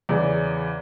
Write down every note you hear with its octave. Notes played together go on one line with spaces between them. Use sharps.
E2 C#3 E3 D5